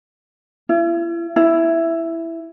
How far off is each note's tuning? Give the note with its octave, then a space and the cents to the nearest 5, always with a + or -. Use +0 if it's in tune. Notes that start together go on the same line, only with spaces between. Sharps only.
E4 +40
E4 +5